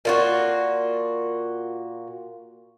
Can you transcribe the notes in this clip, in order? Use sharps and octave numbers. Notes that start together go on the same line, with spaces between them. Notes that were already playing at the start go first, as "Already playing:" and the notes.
A#2 F4 F#4